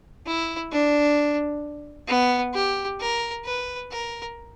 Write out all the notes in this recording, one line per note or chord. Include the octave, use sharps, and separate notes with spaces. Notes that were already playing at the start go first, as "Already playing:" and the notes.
E4
D4
B3
G4
A#4
B4
A#4